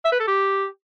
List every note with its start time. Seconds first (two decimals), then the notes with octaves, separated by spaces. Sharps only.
0.05 E5
0.12 B4
0.20 A4
0.27 G4